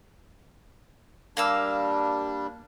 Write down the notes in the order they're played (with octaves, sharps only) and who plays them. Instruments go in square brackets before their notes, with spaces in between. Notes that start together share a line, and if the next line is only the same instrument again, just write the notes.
[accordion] G3 D4 [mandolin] A#3 F5 E6